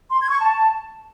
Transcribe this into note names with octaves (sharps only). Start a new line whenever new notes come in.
C6
G#6
C#6
A5